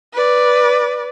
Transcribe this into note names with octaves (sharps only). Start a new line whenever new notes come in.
B4 D5